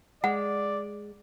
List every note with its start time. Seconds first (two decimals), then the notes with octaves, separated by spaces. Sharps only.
0.24 G#3 D5 F#5